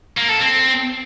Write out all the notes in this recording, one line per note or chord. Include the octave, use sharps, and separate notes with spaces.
A#3
A4
C4